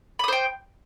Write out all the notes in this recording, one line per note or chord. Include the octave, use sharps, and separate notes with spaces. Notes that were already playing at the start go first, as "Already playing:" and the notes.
C5 G5 B5 D#6